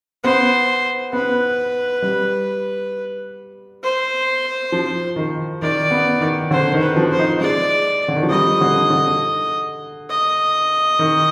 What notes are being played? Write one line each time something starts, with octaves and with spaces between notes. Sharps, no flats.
B3 C5
B3 B4
G3
C5
F3
D#3
D#3 D5
B3
D#3
D3 C5
D#3
B4
F3
C5
D#4
G#3 D5
D3
D#3
F3
G3 D#5
D3
D3
D#5
D#3